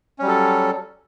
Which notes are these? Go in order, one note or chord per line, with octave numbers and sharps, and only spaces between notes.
F#3 G3 C#4 A4